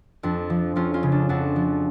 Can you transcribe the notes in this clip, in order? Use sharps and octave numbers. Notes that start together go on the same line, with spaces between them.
F2 D4
F3
F2 C#4 F4
C#4 F4
C#3
D4
F2 D4 F#4
F3